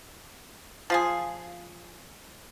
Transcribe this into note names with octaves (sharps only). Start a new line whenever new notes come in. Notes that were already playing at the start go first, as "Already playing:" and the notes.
F3 F4 G#4